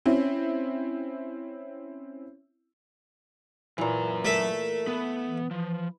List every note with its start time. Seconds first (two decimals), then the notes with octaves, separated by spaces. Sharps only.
0.06 C4 C#4 E4
3.78 F#2 A#2 E3 A#5
4.25 A3 A#4 E5
4.87 B3 B4
5.27 E3
5.51 E3 F3